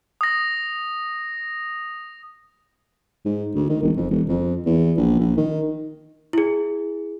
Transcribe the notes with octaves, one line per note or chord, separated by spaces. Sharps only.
D#6 A#6
G#2
D2
D#3
E1
F2
E1
F2
E2
A#1
A#1
D#3
E4 G#4